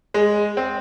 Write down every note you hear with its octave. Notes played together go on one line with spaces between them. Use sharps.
G#3
C4